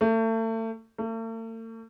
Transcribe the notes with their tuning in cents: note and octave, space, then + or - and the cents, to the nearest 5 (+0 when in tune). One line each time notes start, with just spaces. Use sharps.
A3 +35
A3 +45